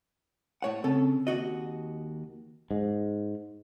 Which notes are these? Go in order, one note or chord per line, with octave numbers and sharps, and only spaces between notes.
A2 C#5 F#5
C#3 C4 A4
D#2 F#4 D#5
G#2